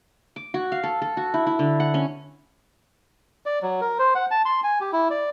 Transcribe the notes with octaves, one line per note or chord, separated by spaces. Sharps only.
D6
F#4
F5
A4
A4
F#4
E4
E4
D3
F#5
C#4
D5
F#3
A#4
C5
F#5
A5
C6
G#5
G4
E4
D5